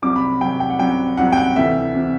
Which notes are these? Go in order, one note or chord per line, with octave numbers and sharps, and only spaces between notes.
C2 C3 F#3 D6
B5
C2 C3 F#3 G5
G5
F#5
C2 C3 F#3 G5
C2 C3 F#3 F#5
G5
F#5
D2 C3 E3 E5
C3 E3